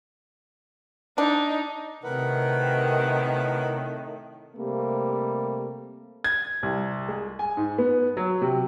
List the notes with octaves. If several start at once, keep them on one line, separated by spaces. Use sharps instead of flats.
D4 D#4
A2 C3 D#3 A#4 B4 F#5
C3 G3 A3 A#3
G#6
C2
G#3
G#5
G#2
B3
F#3
C3